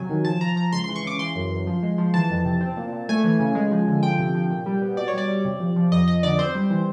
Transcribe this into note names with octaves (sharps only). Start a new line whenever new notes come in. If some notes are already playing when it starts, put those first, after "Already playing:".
Already playing: C3 F#3 G#5
D#3
F3 A5
F3 A#5
F3 A#5
C#2 C6
C6
E3
C#6
C#3 D6
E3 C6
F#2
F#2
F3
G#3
F3
E3 A5
F2
C3
C4
A#2
A#2
A3 G#5
E3
C#3
G#3
F3
D3
F3 G5
C3
F3
A#2
G3
B3
B2 D5
C#5
G3 D5
G3
C3
F3
F3
F2 D#5
F2 D#5
D3 D5
C4 C5
G3
E3